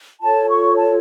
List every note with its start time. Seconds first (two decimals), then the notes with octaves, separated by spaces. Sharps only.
0.21 F4 A4 C#5 A5
0.48 C#6
0.75 A5